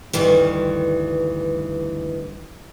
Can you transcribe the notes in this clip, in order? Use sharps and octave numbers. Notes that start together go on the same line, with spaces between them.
D2 G2 D#3 E3